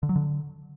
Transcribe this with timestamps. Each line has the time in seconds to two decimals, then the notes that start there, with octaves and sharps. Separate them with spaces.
0.03 D3
0.09 F#3
0.16 D3